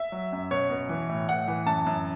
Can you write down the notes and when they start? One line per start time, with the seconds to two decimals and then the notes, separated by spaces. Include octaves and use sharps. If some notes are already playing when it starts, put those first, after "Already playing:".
Already playing: E5
0.12 F#3
0.32 F#2
0.51 B2 C#5
0.70 B2
0.89 E3
1.09 A2
1.28 A2 F#5
1.48 E3
1.66 F#2 A5
1.86 F#2